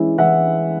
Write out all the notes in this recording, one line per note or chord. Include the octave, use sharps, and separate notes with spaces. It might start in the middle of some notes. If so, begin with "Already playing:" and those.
Already playing: E3 G#3 C#4 E4
E3 E5 F#5